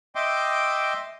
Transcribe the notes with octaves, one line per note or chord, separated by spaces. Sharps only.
D#5 E5 G5 C6 D6